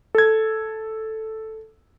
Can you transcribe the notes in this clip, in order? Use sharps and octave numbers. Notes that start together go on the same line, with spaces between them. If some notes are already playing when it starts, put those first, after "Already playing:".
A4 G#6